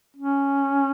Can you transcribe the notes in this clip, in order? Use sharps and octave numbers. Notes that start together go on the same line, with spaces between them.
C#4